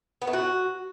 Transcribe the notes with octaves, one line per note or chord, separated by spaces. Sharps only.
B3
A3
F#4